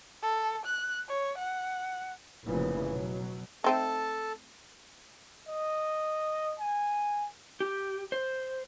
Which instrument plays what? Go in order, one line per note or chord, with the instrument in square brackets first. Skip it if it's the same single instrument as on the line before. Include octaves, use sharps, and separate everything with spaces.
[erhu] A4
F#6
C#5
F#5
[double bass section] F1 A#2 C#3 E3 F3
B2 F#3
[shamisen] A3 C4 D#4 [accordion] A4 A5
[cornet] D#5
G#5
[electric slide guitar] G4
C5